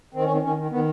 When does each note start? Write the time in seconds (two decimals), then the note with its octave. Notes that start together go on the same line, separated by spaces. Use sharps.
0.14 D#3 C4
0.24 C#4
0.29 D#3 C4
0.43 D#3 C#4
0.58 D#3
0.71 D#3 B3